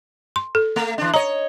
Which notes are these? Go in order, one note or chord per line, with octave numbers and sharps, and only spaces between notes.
C6
A4
A3
E3 D4
C#5 D#5 A#5